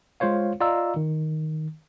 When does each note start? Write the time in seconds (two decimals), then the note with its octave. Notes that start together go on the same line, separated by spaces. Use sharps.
0.20 G#3 F4 C5 C#5 F5
0.60 F4 D5 D#5 F5 A#5 E6
0.96 D#3